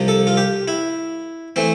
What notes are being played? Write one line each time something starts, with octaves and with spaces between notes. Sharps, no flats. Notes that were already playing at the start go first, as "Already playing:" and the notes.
Already playing: C2 C3 F3
A4
F4
G4
E4
E3 A3 C4